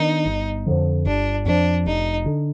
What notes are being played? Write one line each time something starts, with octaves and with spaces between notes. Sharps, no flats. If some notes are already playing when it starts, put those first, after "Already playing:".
Already playing: D#3 B3 D4 D#4
G1
F2 D3 F3
G1 D4
F2 D3 F3 D4
F1 D#4
D3